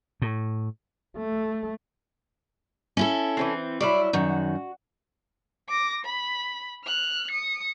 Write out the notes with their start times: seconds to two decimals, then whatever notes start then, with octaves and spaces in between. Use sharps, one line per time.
0.22 A2
1.17 A3
2.97 C#4 E4 A4
3.37 E3 F#3 C4
3.80 F#3 G3 E4 D5
4.13 F#2 D#3 F#4
5.69 D6 A#6
6.05 B5
6.85 F6 F#6
7.31 D#6 C#7